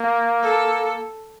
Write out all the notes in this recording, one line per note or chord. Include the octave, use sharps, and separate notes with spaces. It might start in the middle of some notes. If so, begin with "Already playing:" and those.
Already playing: A#3
A4